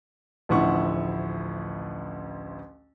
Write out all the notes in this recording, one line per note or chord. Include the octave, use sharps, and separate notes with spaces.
A1 D2 F3 E4 F#5 C#6